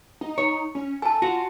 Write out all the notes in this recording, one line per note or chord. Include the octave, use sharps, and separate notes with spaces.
D#4
C#5
C#4
A4 G#5 A5
F4 F#4